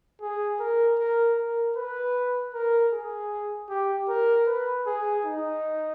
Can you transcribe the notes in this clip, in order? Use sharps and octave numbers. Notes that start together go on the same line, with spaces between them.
G#4
A#4
A#4
A#4
B4
A#4
G#4
G4
A#4
B4
G#4
D#4